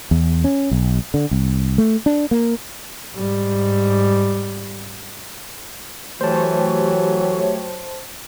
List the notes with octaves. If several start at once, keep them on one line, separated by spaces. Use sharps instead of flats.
E2
C#4
B1
D3
C2
A3
D4
A#3
G#2 G3
E3 F#3 A3 G4 C5 C#5 A5